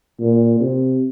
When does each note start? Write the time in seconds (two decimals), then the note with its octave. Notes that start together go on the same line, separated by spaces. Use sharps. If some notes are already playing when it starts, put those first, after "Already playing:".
0.20 A#2
0.61 C3